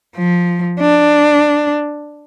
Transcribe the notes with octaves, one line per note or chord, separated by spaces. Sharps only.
F3
D4